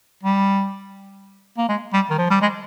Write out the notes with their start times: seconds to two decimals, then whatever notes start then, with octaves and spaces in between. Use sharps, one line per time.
0.23 G3
1.58 A#3
1.69 G#3
1.93 G3
2.10 D#3
2.18 F3
2.30 G3
2.42 G#3